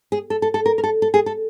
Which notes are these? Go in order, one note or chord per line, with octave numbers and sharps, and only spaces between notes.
G#4
A4
A4
A4
A#4
A#4
A4
A4
G#4
A4